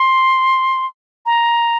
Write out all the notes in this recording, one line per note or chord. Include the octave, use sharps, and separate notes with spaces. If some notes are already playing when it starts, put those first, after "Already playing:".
Already playing: C6
A#5